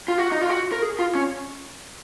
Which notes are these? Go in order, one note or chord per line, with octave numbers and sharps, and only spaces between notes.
F4
F#4
D#4
F4
F#4
A#4
G#4
F4
C#4